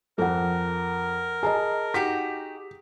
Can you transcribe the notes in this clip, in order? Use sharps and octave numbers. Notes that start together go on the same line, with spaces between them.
F2 A4 A#4 F#5
G#4 D#5 A5 A#5
D#4 F#4 G4 B6